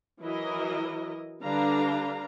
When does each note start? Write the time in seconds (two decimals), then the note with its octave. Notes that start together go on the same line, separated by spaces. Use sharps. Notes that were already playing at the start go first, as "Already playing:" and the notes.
0.20 E3 F#3 E4 A#4 D#5
1.43 D3 G3 D4 B4 F5 A#5